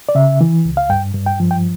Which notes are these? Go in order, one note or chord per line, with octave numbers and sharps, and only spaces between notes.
D5
C#3 E5
E3
C#2
F5
G2 G5
G2
G5
F3
G5